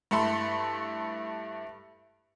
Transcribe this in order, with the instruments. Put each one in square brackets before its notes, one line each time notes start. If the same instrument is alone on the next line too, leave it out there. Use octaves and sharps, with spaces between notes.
[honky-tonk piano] G2 A3 E4 A4 B5 C6